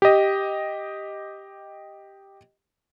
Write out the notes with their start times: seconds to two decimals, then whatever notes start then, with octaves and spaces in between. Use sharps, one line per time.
0.02 G4 D#5